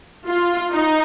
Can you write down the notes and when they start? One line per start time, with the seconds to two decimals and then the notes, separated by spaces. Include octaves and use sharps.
0.27 F4
0.72 D#4